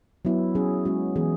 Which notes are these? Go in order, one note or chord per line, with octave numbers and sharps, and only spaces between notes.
F#3 B3 E4
F#3 C#4 G#4
G#3 C#4 F#4
E3 B3 E4 G#4